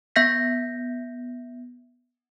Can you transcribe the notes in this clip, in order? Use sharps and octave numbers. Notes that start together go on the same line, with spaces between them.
B3 E5 G6 A#6 B6